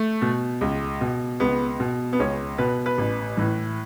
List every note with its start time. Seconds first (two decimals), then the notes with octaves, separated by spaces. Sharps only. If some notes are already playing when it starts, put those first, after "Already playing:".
Already playing: A3
0.22 B2
0.61 C#2
1.01 B2
1.40 C#2 B3
1.80 B2
2.13 B3
2.19 C#2 C#4
2.58 B2 B4
2.86 B4
2.98 A1
3.37 A2 E3